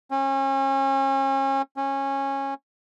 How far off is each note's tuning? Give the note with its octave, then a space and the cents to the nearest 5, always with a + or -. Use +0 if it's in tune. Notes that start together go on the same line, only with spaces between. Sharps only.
C#4 -35
C#4 -20